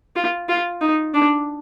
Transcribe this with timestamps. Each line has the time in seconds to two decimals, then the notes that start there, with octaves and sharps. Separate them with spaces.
0.16 F4
0.49 F4
0.81 D#4
1.14 D4